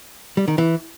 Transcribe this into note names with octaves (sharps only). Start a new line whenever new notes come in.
G3
D#3
E3